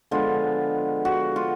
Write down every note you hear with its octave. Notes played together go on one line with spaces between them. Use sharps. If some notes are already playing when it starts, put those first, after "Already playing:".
D3 F3 G#3 B3 F4
F#4
F4